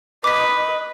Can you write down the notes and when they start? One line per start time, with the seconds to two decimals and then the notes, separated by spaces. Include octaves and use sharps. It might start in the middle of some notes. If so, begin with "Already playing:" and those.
0.24 B4 D#5 D6 B6